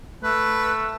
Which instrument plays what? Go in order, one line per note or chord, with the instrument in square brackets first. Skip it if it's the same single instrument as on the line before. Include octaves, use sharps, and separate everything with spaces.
[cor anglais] A3 [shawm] B4